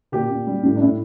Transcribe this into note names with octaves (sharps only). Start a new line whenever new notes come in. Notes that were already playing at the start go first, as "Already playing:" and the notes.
A#2 G4
A#2
G3
A2
D4
A2 E4